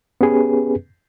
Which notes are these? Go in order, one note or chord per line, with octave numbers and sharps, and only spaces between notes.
B3 C#4 G4 G#4 B4